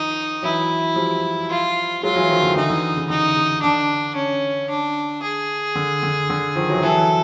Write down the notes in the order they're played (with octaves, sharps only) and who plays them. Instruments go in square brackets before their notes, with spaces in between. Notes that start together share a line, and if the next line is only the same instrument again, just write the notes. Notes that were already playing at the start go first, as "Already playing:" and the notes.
Already playing: [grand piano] D#3 F3 [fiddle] D#4
[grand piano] E3 F#3 [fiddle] E4
[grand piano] F3 G3
[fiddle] F4
[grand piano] F#3 G#3 [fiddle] F4
[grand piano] E3 F#3
D#3 F3
D3 E3
[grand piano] D3 E3 [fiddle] D#4
[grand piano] D3 E3
C#3
[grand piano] D3 [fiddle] D#4
[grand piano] C#3
[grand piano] D3 [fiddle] D4
[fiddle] C#4
D4
G#4
[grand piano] D3
D3
D3
D#3 F3
E3 F#3
[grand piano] E3 F#3 [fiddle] A4